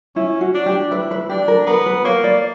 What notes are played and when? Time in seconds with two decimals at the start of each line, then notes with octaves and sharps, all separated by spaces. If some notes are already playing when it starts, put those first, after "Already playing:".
0.16 C#4 E4
0.41 F#4
0.54 D4
0.66 G4
0.91 E4 B4
1.11 B4
1.29 D4 G4
1.48 A#4
1.67 B3 A#4
1.86 B4
2.04 A#3 C#5
2.24 D5